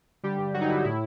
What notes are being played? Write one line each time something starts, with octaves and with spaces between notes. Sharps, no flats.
D3 G3 G4
G2
G2 F#3 F#4
D#4
D3 E4
A2 E4